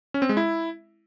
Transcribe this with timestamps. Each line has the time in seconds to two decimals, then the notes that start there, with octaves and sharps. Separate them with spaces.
0.14 C#4
0.22 C4
0.29 G#3
0.37 E4